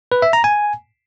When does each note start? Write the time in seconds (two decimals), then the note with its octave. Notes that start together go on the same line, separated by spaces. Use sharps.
0.12 B4
0.22 E5
0.33 A#5
0.44 G#5